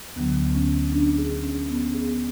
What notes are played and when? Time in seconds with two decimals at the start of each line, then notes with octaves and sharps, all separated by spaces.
0.16 D2 D3 F#3 B3
0.55 C#4
0.92 D4
1.18 G#4
1.43 C#4
1.69 B3
1.94 G#4